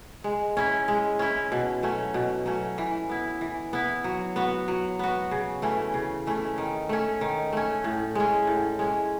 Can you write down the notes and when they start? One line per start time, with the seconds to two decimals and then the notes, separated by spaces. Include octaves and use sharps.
0.24 G#3
0.57 C#4 E4
0.88 G#3
1.19 C#4 E4
1.52 B2
1.83 F#3 A3 C#4
2.14 B2
2.46 F#3 A3 C#4
2.78 E3
3.09 B3 E4
3.41 E3
3.73 B3 E4
4.04 F#3
4.36 B3 F#4
4.68 F#3
4.99 B3 F#4
5.31 C#3
5.62 E3 A3 C#4
5.94 C#3
6.27 E3 A3 C#4
6.58 D#3
6.89 A3 C#4
7.21 D#3
7.53 A3 C#4
7.84 A2
8.15 G#3 C#4
8.47 A2
8.79 G#3 C#4